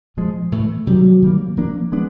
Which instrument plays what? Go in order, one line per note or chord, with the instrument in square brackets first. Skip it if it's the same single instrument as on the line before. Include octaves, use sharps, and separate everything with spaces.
[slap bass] A#2 F3 G#3
A2 E3 A3
[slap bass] C3 D#3 G3 [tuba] F#3
[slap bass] D#3 G3 A#3
F3 A#3 D4
F3 G#3 B3 D4